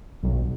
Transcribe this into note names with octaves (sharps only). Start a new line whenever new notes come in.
B1